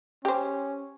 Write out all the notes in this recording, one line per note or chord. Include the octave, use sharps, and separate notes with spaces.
C#4 G4 C5